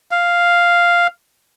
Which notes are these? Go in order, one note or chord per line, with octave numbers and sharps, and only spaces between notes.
F5